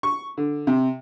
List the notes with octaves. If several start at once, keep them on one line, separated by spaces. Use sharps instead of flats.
C#6
D3
C3